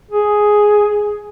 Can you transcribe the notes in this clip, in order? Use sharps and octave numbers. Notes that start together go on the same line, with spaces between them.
G#4